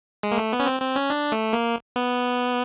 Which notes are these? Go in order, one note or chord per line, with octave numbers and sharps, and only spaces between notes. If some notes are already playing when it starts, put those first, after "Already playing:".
G#3
A#3
A3
B3
C#4
C4
C4
C#4
D4
A3
A#3
B3